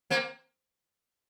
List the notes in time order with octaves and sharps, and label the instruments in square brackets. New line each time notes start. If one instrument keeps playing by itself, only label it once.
[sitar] A#3 C4